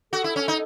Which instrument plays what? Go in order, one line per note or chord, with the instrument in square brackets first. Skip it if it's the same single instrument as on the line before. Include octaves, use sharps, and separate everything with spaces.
[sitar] F#4 [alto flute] A4
[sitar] E4
C#4
D#4